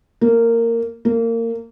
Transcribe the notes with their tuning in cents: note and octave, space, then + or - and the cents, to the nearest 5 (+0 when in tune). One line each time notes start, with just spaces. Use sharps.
A#3 -15
A#3 -25